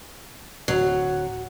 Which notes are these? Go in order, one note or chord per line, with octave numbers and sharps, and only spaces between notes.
D1 F#3